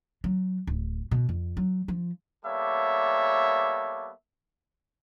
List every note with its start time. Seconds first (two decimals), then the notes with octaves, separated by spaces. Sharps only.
0.24 F#3
0.67 D1
1.11 B2
1.29 F2
1.57 F#3
1.88 F3
2.45 G3 A#3 B3 A4 C#5 E5